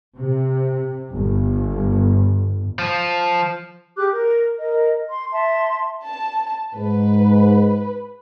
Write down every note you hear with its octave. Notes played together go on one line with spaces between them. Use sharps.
C3
G1
F3
G4 G#4 D6 F#6
A#4
A#4 D#5
C6
E5 A5 C6
A5
G#2 B4